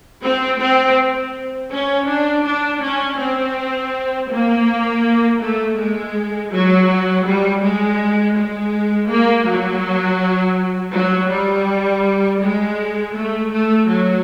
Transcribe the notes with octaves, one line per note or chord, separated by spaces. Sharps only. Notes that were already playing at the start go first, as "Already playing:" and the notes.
C4
C4
C#4
D4
D4
C#4
C4
A#3
A3
G#3
F#3
G3
G#3
G#3
A#3
F#3
F#3
G3
G#3
A3
A3
F#3